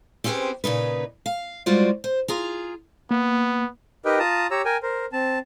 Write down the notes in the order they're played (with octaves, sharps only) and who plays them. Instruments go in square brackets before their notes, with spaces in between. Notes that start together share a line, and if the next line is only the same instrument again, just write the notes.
[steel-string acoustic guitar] C4 C#4 G4 G#4 B4 C5
A#2 C#3 D#4 B4
F5
G3 G#3 F4 F#4 C5 D5
C5
F4 G#4 A#5
[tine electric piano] A#3 [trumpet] B3
[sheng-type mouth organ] D#4 G4 A#4 B4 D#5 G5
F4 A5 A#5 D#6
G4 C#5 A#5 E6
A#4 G5 G#5
A#4 C5
C4 A5